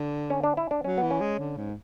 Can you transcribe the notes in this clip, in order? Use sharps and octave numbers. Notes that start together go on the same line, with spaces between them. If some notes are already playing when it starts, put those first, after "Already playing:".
Already playing: D3
C#4
D4
E4
D4
F#3 C#4
E3 B3
C#4
G#3
D3
G#2